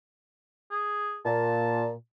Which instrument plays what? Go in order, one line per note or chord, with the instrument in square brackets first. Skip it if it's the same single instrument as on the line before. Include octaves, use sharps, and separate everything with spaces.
[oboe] G#4
[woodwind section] A#2 [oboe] A5